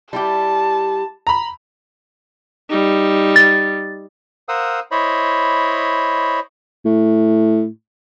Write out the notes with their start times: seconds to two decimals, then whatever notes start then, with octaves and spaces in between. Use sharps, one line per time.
0.13 G3 E4 G4 A5
1.27 A#5 B5
2.70 G3 D#4
3.36 A6
4.49 A#4 C5 F5 F#5 D#6 E6
4.91 E4 C5 C#5 D#5 B5
6.85 A2